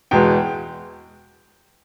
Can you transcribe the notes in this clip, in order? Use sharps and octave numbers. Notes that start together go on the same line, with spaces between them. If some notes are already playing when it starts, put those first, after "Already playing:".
E2 B2 G#3 B3 G5